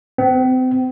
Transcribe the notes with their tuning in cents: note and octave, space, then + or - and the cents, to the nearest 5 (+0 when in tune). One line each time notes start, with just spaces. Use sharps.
C4 -35